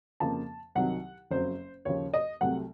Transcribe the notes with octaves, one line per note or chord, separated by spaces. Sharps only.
F2 C#3 F3 A#3 A5
C2 C3 D#3 F#3 F#5
F#1 F2 C#3 F#3 C5
D#2 C#3 F3 C#5
D#5
C2 C3 F#3 A3 F#5